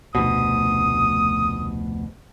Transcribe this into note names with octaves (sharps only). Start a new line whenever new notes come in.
F1 D2 B2 D#6